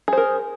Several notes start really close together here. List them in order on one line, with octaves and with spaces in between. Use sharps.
G#4 C5 A#4